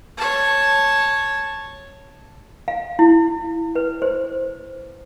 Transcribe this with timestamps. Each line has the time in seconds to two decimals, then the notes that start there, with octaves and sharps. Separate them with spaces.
0.18 C#5 A5
2.68 F5
2.99 E4
3.75 B4
4.02 C5